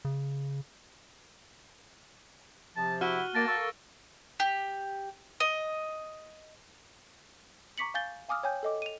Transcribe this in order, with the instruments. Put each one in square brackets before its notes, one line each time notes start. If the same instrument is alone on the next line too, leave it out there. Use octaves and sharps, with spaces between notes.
[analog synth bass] C#3
[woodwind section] C3 F3 [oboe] A5
[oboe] E4 [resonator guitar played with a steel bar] F#4 [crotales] F6 D#7 G7
[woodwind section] A#3 [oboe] A5 [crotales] A6 A#6 D7
[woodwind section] A#3 A4 C#6
[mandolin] G4
D#5
[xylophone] A#5 C#6 D6 B6 C#7 F#7
F5 G#5 G6 A6 G7
F5 G#5 D6 D#6 F6
C#5 G5 G#5 G6
A4 D#5 D6
D#7 F7